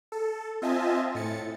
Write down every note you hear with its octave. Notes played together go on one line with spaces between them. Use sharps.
A4
C4 F4 D#5 E5 G#5 A5
A2 A6 C#7